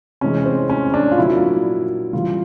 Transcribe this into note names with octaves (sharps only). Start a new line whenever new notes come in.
C3 E3 G#3 C#4
C4
C#4
D4
F4
A#2 F#3 E4
C#3 E3 G3 F4